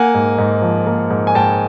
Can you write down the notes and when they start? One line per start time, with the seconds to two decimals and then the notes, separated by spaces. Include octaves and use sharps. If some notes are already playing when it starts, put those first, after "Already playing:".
Already playing: A#3 F#5 G#5
0.14 G#2
0.38 G#2
0.62 F3
0.87 A#3
1.10 G#2
1.27 G#5
1.35 G#2 G5 A5